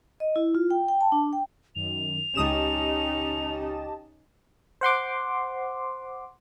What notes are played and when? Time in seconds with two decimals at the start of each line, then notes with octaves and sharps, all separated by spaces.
0.20 D#5
0.36 E4
0.55 F4
0.70 G5
0.88 G5
1.01 A5
1.12 D4
1.33 G5
1.75 F#2 D#3 F7
2.35 C#2 C#4 D#4 G4 D#5 A5 D#6 E7
4.81 C5 F#5 C6 D6